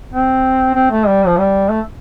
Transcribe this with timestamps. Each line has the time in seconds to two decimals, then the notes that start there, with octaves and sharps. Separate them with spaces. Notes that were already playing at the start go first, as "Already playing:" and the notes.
0.13 C4
0.75 C4
0.91 A3
1.07 G3
1.26 F3
1.38 G3
1.69 A3